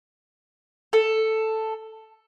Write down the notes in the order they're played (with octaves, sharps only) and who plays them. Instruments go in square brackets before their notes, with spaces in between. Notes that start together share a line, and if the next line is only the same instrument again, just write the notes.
[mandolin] A4